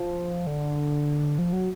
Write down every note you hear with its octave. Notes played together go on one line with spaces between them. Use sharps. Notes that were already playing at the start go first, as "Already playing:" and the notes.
Already playing: F3
D3
F3
F#3